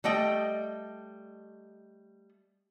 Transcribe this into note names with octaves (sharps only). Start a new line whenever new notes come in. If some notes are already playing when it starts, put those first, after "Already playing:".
G3 A3 D#5 G5